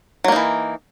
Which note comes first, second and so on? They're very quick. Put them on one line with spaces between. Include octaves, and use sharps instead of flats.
F#3 A#3 D#4 E3